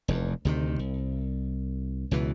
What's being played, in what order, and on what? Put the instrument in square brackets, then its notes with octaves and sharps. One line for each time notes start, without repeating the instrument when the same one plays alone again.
[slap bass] F1 E2
D2 C3 D#3
C2
C#2 B2 E3